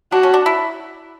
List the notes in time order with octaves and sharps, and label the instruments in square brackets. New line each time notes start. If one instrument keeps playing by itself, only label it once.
[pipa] D4 [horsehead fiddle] F#4
[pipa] C#4
D4
E4